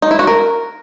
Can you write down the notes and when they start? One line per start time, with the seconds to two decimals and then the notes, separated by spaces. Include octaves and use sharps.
0.02 D#4
0.11 E4
0.19 F#4
0.27 A#4